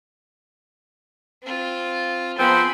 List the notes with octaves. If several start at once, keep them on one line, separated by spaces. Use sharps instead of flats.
C4 F4
F3 B3 C4 G#4 B5 C6